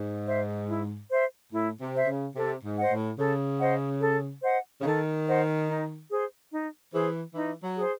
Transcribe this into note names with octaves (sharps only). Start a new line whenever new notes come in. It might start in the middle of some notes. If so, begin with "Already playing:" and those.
Already playing: G#2
C5 E5
E4
C5 E5
A2 E4
C3
C5 E5
C#3
C3 A4
G#2
C5 D#5 F#5
A2
C#3 A4
C5 D#5 F#5
A4
C5 D#5 F#5
C#3
D#3 A4
C5 D#5 F#5
D#4
G#4 C5
D#4
E3 G#4 C5
E3 D#4
F#3
G#4 C5